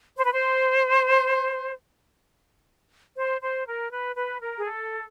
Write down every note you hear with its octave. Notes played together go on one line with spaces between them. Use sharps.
C5
B4
C5
C5
C5
A#4
B4
B4
A#4
G#4
A4